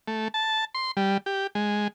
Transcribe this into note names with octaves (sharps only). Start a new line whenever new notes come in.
A3
A5
C6
G3
G4
G#3